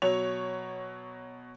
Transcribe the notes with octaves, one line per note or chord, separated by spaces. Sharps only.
B2 F#3 C#5 F7